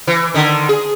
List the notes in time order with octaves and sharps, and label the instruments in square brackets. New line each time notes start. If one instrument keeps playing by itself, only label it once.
[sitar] E3
D3 D#3
G#4